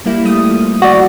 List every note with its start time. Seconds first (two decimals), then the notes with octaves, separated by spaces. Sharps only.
0.06 G3 A#3 E4
0.25 G3 A3 D#6
0.50 F3
0.82 F#4 D5